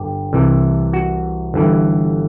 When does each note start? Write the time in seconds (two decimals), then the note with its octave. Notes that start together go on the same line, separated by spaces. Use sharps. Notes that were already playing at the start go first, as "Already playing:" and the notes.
Already playing: G1 G2 G4
0.33 C2 C3 E3
0.93 F#4
1.54 G1 G2 E3